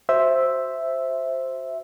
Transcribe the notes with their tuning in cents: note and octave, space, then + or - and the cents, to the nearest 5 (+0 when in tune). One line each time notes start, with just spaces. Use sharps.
F#4 +0 C5 +0 E5 +0